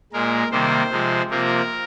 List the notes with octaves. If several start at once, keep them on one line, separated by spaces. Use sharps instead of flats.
A#2 G#3 A#4
C3 D#3 G3 A#3 C5
C3 F3 G#3
C3 F3 A#3 A#4